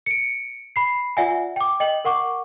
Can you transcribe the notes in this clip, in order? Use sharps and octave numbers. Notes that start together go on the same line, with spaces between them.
C#7 D7
B5 C7
F4 D5 E5 F#5 G#5
G5 D6
D#5 G5 F#7
A#4 F#5 C#6 D6